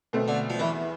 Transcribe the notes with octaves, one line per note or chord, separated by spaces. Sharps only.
B2 A3 C4
D3
F3
E2 E3